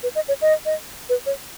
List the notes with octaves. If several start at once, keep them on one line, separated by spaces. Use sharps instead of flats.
B4
D#5
C#5
D#5
D#5
B4
C#5